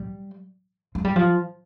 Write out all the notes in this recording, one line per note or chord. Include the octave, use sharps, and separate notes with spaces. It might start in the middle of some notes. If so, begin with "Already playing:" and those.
Already playing: G3
G#3
G3
F3